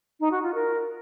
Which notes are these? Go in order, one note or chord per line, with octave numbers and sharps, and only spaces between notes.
D#4
F#4
F4
A#4